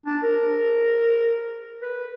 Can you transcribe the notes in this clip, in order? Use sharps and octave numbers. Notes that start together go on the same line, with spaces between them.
D4
A#4
B4